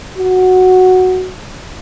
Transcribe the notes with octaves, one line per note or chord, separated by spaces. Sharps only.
F#4